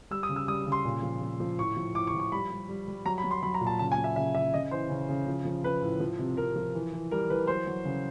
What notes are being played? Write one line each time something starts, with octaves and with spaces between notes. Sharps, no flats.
G3 E6
D#6
C#3
E6
G3 D#6
C#3
C6
A#2
F3
F3
F3
A2 C#6
F3
A2 D6
C#6
F3
C#6
G3 B5
G3
G3
G3
F#3 A#5
B5
F#3
C6
F#3 B5
A#5
A#2
A5
C#3 A5
G#5
F#3
E5
C#3 E5
C#3 E5
C#3 D#5
E3 C5
C#3
C#3
F3
F3
F3 B4
A2
F3
C3
C3 A#4
F3
E3
E3
G3 A#4
E3 B4
F#3 C5
F#3
C#3